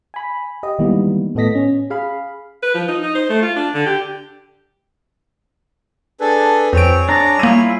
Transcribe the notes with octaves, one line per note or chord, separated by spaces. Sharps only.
G#5 B5
G4 D#5
D#3 E3 G3 G#3 A#3 B3
A2 B3 A4 D#5 A#6 B6
C#4
G#4 F5 B5
B4
F3
D#4
D#4
C5
A3
F4
D4
D3
G4
D4 G#4 A4 B4
F2 C4 G#4 C#5 D7
D4 D5 A#5
G3 A#3 E4 F4 D#7